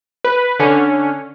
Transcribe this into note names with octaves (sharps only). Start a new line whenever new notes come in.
B4
D3 C#4